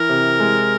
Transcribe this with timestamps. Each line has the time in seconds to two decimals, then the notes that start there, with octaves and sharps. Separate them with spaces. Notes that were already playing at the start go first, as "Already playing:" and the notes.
Already playing: E3 A#4
0.09 C3
0.40 G#3